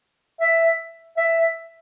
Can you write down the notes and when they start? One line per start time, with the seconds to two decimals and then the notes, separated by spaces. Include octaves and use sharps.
0.41 E5
1.17 E5